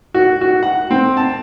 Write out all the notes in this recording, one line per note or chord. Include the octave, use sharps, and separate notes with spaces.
F#4
F#4
F#5
C4
A5